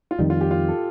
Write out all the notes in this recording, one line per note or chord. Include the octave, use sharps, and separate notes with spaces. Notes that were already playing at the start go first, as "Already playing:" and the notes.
F4
F2 D#3 G3 D#4
F4
G4
F4
A4